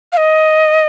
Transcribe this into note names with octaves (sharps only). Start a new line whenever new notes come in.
F5
D#5